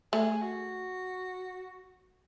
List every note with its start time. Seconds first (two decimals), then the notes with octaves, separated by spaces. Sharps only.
0.13 A3 G#4
0.42 F#4